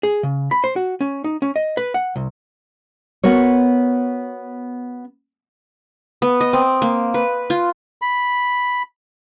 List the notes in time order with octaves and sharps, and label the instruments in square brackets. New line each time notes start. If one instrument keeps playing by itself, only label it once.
[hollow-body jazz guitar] G#4
C#3
B5
C5
F#4
C#4
D#4
C#4
D#5
B4
F#5
C2
[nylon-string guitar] B3 F#4 A#4 C#5
[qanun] B3
D#5
C4
A#3
B4
F4
[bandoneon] B5